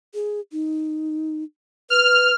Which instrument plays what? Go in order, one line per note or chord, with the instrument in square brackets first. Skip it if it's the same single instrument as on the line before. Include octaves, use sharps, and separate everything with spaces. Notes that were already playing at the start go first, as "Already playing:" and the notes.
[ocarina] G#4
D#4
[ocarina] B4 [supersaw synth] F6